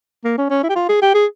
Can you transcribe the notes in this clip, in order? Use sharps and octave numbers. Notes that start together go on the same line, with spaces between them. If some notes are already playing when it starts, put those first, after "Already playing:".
A#3
C#4
C#4
E4
G4
F4
G#4
G4
G#4